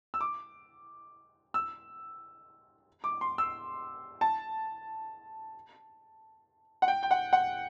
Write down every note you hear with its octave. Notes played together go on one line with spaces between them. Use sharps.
E6
D6
E6
D6
C6
E6
A5
F#5
G5
G5
F#5
F#5